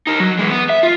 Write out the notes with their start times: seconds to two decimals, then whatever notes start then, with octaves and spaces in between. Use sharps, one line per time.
0.07 A#3 D#4
0.20 F#3
0.39 E3 G#3
0.50 B3
0.70 E5
0.83 F4